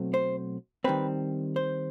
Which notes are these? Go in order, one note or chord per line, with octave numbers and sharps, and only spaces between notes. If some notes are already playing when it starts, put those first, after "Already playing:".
Already playing: B2 F#3 A3 C4
C5
D#3 G3 C4 B4
C5